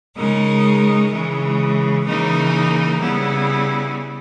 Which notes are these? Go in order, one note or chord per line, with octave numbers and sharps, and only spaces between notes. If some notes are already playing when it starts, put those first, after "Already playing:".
C#3 G#3 D#4 A#4
C#3 E3 G#3
C#3 E3 A#3 D#4 A#4
C#3 G3 B3 E4